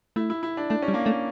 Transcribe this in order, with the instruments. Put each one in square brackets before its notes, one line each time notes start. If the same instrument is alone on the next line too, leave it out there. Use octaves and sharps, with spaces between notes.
[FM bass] A3 [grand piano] E4
[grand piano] E4
E4
D4
[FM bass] A3 [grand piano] D4
[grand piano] C#4
[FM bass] G3
[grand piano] A#3
[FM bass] A3 [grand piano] C#4